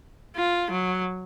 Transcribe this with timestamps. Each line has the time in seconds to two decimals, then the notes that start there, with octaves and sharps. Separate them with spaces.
0.36 F4
0.71 F#3